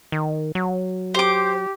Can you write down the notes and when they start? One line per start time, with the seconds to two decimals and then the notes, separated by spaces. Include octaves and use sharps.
0.12 D#3
0.55 F#3
1.14 G4 C5 D6